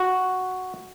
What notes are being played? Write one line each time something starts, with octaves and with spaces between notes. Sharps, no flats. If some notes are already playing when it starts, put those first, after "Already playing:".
Already playing: F#4